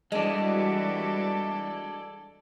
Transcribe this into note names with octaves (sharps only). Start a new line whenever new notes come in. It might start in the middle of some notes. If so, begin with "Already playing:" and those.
E3 G3 G#3 D4 F#4 A4 D5 D#5